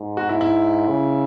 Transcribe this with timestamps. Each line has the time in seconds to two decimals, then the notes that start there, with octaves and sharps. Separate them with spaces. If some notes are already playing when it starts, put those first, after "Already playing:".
Already playing: G#2
0.17 F#4
0.29 E4
0.41 E4
0.88 C#3